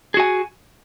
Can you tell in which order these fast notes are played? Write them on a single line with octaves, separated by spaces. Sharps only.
G#4 F#4 G#5